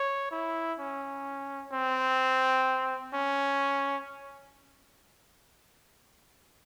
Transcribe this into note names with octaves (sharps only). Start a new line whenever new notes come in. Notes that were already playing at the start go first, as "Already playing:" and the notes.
Already playing: C#5
E4
C#4
C4
C#4